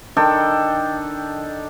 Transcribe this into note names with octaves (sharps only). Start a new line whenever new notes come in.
D#3 D4 A4 G5